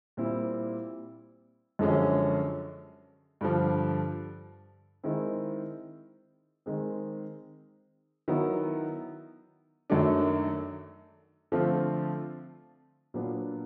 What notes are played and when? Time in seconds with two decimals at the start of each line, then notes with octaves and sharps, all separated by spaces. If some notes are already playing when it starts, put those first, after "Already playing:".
0.17 A#2 G3 C4 E4
1.79 F#2 D3 F3 G#3 C#4
3.41 G2 D3 F3
5.04 D#3 G#3 C4 E4
6.66 D#3 G#3 C4
8.28 D#3 F#3 B3 E4
9.90 F#2 D#3 F#3 A3 D4
11.52 D3 F3 A3 C4 F4
13.14 A#2 F#3 B3 D4 F4